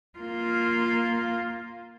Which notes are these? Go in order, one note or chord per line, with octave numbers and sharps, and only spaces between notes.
A#3 F4